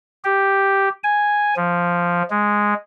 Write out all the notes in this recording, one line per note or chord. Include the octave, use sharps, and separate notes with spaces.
G4
G#5
F3
G#3